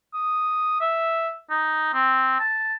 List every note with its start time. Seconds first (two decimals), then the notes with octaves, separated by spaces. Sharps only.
0.14 D#6
0.81 E5
1.50 D#4
1.94 C4
2.40 A5